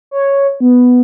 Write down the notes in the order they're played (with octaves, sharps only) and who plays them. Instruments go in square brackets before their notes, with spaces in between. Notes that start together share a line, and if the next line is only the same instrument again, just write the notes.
[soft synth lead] C#5
B3